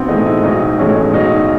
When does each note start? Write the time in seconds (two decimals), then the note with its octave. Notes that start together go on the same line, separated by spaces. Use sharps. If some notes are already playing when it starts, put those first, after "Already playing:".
Already playing: B1 B3 C4
0.08 A2 E3 G#3 D#4
0.26 E4
0.43 B1 D#4
0.79 A2 E3 G#3 C#4
0.96 D#4
1.13 B1 D#4